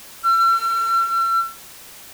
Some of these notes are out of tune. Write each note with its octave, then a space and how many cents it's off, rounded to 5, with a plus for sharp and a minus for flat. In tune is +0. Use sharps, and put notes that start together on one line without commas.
E6 +45